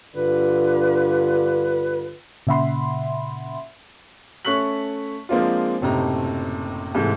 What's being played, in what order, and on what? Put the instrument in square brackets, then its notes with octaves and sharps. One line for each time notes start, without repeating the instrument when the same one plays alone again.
[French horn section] G2 D3 F4 [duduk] B4
[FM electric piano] A#2 C#3 E5 F#5 B5 C6
[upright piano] A3 C#4 C#6 F#6 B6 F#7
F3 G#3 A#3 C4 D4 F4
F#1 A2 C3 D#4 A#5
G#2 C3 E3 G#3 A3